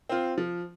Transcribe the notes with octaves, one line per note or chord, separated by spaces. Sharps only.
C4 F4
F3